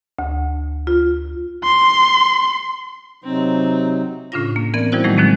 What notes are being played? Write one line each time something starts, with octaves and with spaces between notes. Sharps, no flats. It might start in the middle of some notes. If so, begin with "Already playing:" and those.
D2
F4
C6
C3 F#3 C4 D#4
A2 C#3 C#4 D4 F4 A#6
A#3
E3 B3 C4 A#4 D5 G#6
E3 G3 D#4 E4 F#4 C5
A2 D#3 E3 F#3 G#3 A3
D3 E3 F3 G#3 A#3 C4